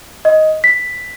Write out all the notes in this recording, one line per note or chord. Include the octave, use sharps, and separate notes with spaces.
D#5
B6